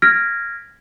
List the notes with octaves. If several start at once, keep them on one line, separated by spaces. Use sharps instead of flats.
F6 G#6 A#6 B6 D7